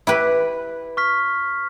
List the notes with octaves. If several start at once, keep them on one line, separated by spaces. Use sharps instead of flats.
E4 G4 B4
C#6 F6 B6